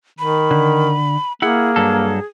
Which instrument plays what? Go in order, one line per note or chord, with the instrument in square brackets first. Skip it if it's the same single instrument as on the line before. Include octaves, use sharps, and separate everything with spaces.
[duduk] D#3 [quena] B5
[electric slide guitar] D3
[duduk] A#3 [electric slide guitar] E4 F#5 [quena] G#4
[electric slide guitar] G2 F#3 A4